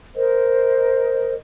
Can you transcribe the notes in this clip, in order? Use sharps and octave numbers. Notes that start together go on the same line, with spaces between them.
A#4 C5 D#5